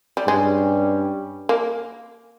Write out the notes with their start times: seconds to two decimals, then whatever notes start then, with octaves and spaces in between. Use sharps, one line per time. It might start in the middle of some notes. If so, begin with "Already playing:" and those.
0.17 G3
0.27 G2 G3 G#3 C#4
1.49 A#3